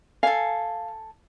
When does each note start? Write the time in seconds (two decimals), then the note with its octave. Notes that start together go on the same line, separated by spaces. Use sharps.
0.23 A4 F5 G#5